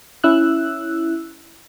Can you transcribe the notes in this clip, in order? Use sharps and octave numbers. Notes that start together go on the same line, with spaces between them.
C#4 E4 E6 F#6